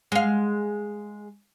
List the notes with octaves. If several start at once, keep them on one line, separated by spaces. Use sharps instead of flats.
G#3 F5